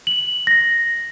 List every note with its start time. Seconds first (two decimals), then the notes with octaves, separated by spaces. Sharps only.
0.07 F#7
0.47 A#6